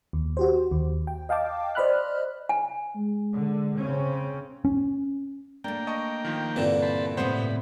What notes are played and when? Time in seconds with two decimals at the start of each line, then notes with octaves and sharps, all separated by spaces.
0.13 D#2
0.37 F#4 G4 C5
0.71 D#2
1.07 G5
1.29 D#5 F5 G5 A5 D6
1.75 C5 D5 D#5 B5 F6 F#6
2.49 G#5
2.96 G#3
3.33 D3
3.77 C#3 C4 C#4
4.65 C#4
5.64 A3 A#3 D4 G5
5.87 D#5 A5 C#6
6.25 D#3 F3
6.56 G2 A#2 D3 E3 C4
6.82 C5 A5 B5
7.17 A2 C3 B3 C4 C5 F#5 B5